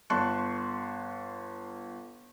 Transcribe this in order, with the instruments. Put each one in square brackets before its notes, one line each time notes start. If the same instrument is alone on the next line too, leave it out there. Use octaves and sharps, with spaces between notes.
[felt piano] G1 A5 C6 C#6 F#6